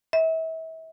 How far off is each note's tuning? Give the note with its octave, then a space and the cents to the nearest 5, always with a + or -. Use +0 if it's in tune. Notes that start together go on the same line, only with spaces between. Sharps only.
E5 -35